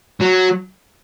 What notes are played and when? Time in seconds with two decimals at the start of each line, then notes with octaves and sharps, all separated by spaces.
0.21 F#3